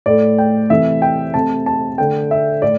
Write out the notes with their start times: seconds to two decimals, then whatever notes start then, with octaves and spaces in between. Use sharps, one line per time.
0.06 A2 A3 D5
0.38 G5
0.70 C3 E3 A3 E5
1.02 G5
1.34 C3 A3 A5
1.66 A5
1.98 D3 A3 G5
2.31 E5
2.62 A2 D5